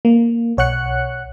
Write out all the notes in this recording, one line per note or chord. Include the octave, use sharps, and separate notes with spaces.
A#3
B1 C#5 F#5 F#6 C#7